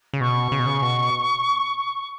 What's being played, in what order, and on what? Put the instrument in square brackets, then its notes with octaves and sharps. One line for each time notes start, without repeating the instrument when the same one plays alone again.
[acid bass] C#3
[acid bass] B2 [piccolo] C#6
[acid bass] C#3
B2
C#3
B2